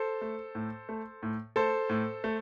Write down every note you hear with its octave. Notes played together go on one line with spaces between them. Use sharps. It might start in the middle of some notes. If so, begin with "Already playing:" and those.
Already playing: A4 C5
A3
A2
A3
A2
A3 A4 C5
A2
A3